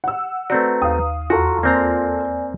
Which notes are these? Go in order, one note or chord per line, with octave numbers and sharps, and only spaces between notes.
F#5 E6
A3 C4 F#4 B4 D5 A#5
D#2 F5 D#6
E2 F4 F#4 A4 A#5 C6 C#6
A#3 C4 D5 G#5 A#5